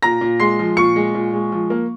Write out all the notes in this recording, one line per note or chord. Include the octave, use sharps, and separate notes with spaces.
A#2 A#5 A#6
A#2
G#3 C6 C7
F3
A#2 C#6 C#7
G#3
A#2
G#3
F3
A#3